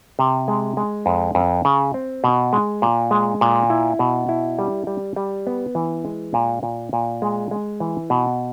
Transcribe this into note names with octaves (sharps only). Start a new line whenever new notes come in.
C3
G#3
G#3
F2
F2
C#3
C4
B2
G#3
A#2
G#3
A#2
E4
B2
E4
G3
G3
G3
B3
E3
G#3
A#2
A#2
A#2
G#3
G#3
E3
B2